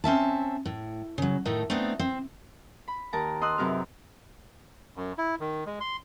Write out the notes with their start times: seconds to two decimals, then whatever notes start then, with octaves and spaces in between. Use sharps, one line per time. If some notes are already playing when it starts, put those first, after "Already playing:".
0.04 C4 C#4 E5 A5
0.66 A2
1.18 C#3 F#3
1.45 A2 D#3 A3 D#4
1.70 A3 B3 C4 D4 D#4
1.99 C4
2.88 B5
3.13 D#2 A#4 A5 A#5
3.41 D#5 C6 D#6 E6 F#6
3.58 F#2 C3 G#4 A#4 B4 F6
4.96 F#2
5.18 E4
5.40 D#3
5.66 G#3
5.81 C6